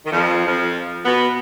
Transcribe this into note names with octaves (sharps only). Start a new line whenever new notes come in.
D#3
F2 F3
F2 F3
B2 B3